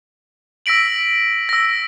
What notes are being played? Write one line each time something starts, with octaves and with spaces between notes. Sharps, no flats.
E6 A#6 B6 D7 F#7
E6 A#6